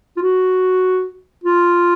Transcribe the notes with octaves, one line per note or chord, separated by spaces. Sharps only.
F4
F#4
F4